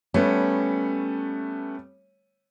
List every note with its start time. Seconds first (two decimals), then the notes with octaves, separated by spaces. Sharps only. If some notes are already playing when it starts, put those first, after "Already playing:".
0.14 G3 A3 B3 C#4